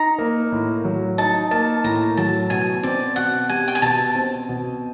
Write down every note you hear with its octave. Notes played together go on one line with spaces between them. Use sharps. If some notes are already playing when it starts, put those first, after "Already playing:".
Already playing: D#4 A#5
A#3
A2
F#3
D#4 A5
A#3 A5
A2 A#5
F#3 A5
B2 G#5
C4 D5
B2 F#5
G3 G#5
G5
G#5
B2 A5
C4
B2